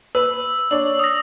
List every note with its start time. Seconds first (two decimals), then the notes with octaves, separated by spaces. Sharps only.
0.15 B4 E6
0.71 D4 C#5 F#7
0.99 D#6 A#6